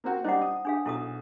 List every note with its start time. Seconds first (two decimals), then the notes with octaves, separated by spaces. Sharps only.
0.04 A#3 C4 F#4
0.24 G3 D4 D#4 C5 F#5
0.42 D#6
0.65 D4 G#4 F5
0.86 B1 E4 A4 D#6